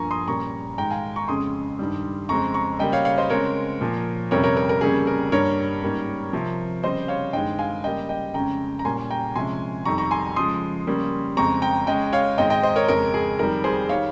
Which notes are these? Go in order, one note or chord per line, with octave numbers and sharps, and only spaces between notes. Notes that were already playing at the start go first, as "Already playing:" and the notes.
Already playing: G2 F3 A#3 G#5 A#5 C#6
C6 D#6
A#2 G3 A#3 C#4 A#5 C#6
G#2 D#3 G#3 G5 A#5
F5 G#5
A#5 C#6
F2 C#3 G#3 C#4 C6 D#6
G2 D#3 G3
F2 C#3 G#3 C4 A#5 C#6
A#5 C#6
C#3 G3 A#3 C#4 D#5 G5
C#5 F5
C#5 F5
C5 D#5
C#3 G#3 C4 A#4 C#5
A#2 F3 A#3
F2 C3 G3 C#4 A#4 C#5
A#4 C#5
A#4
A#4
F2 C#3 G3 A#3 C#4 G#4
A#4
G2 G3 A#3 A#4 C#5
G#2 G3 A#3 C#4
C3 F3 C4
C#3 G3 C4 C5 D#5
C#5 F5
G2 D#3 G#3 C4 D#5 G5
F5 G#5
C#3 G3 A#3 D#5 G5
D#5 G5
F2 C#3 G#3 C#4 G5 A#5
A#5
A#2 G3 A#3 C#4 G#5 C6
G5 A#5
C3 F3 G#3 C#4 G#5 C6
F2 D#3 G3 A#5 C#6
A#5 C#6
G#5 C6
C#3 F3 G#3 C6 D#6
C#3 G3 A#3 C#4
F2 C#3 G#3 C4 A#5 C#6
G5 A#5
C#3 G#3 C#4 D#5 G5
C#5 F5
G#2 D#3 G#3 C4 D#5 G5
D#5 G5
C5 D#5
A#4 C#5
F2 C#3 G#3 C#4 A#4
G#4
F2 D#3 G3 A#4
G#4 C5
D#3 G3 C#5 F5